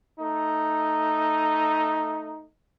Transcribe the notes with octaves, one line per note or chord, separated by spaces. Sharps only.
A3 D#4